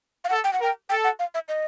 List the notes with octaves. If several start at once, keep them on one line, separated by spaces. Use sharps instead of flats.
F5
A4 F#5
G5
F#5
A#4 G5
A4 G5
F#5
F5
E5
D#5